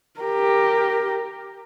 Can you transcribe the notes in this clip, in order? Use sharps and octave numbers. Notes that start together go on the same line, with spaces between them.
G4 A#4